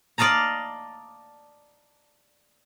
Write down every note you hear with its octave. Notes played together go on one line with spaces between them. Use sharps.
D5 D#5 F5 A5 A#5